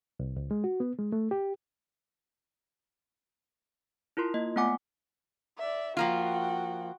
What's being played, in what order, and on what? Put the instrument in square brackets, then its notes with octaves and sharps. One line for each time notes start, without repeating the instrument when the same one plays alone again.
[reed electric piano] C2
C#2
G#3
F#4
B3
G#3
A3
G4
[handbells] E4 F4 A#4 C6
A#3 D#5
A3 B3 F4 F#5 G#5 D6
[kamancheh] D5 E5
[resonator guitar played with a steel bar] F3 A#3 F4 [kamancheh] F#4 G5